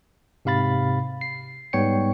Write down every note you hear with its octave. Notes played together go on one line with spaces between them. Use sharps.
G#2 C3 F5 B5 A6
C7
G#2 G3 B3 C#5 G5 C#7